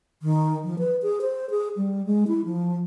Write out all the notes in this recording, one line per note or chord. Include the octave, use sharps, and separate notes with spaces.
D#3
F3
B4
G#4
C5
G#4
G3
G#3
E4
F3